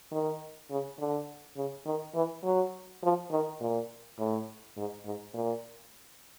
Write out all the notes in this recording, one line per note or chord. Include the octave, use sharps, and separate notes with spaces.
D#3
C#3
D3
C#3
D#3
E3
F#3
F3
D#3
A#2
A2
G#2
G#2
A#2